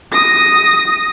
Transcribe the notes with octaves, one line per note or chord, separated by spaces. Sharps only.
D#6 A#6